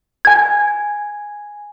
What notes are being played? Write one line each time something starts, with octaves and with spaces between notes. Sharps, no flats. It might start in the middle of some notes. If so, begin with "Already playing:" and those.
G#5 G#6